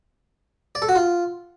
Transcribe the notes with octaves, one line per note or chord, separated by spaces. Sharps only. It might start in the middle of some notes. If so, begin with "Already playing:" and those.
D5
A4
F#4
F4